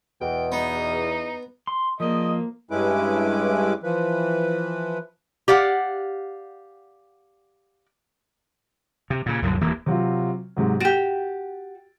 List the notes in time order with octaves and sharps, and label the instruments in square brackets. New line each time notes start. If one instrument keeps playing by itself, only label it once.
[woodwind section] E2 [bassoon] B2 [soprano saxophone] G5
[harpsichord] B3 [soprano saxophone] D#4
[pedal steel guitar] C6
[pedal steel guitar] F3 [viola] A#3 [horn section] G#4 D5 D#5
[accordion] G2 G#3 C#4 E4 B4 D6
E3 F3 B4
[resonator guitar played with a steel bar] G4 D5 F5 F#5
[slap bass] C3
A#2 C#3
C2 F#2 A#2 D3
D#1 E3 A#3
[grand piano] C3 F#3 F4
G#2 C3 F#3
[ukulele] F#4 G4 [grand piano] A6 D7